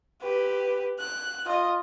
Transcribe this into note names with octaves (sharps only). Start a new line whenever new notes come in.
G4 B4
F#6
F4 D#5